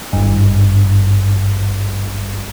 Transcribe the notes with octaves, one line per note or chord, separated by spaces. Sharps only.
G#1 G2